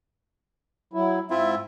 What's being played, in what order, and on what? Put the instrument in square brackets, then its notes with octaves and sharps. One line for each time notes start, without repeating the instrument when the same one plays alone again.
[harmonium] F#3 E4
[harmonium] G#2 E5 [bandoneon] C4 E4 F4